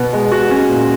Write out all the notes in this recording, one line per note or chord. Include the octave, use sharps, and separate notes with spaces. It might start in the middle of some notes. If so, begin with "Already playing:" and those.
Already playing: B2 B3
G#3
F#4
C#4
A#2